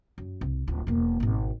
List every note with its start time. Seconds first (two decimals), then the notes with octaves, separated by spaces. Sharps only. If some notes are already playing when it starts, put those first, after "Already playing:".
0.18 F#2
0.41 C2
0.68 D1 F4
0.87 E1 A#3
1.20 G#1 B2